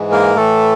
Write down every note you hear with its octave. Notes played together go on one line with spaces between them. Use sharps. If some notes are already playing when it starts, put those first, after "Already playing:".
Already playing: G#2 E3 G#3
A#3 A#4
A2 E3 A3 A4